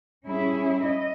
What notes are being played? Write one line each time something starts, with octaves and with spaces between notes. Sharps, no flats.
G3 C#4 E4 G#4
D#5